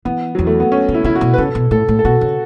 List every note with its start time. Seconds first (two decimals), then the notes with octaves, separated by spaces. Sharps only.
0.05 E3 B3
0.35 E2 F#3
0.47 A3
0.60 B3
0.72 C#4
0.89 C#3
0.94 E4
1.04 C#3 E4
1.15 F#4
1.21 B2
1.34 B4
1.38 C#3 A4
1.55 B2
1.71 A2 A4
1.88 A2
1.99 A4
2.05 B2 F#4
2.21 C#3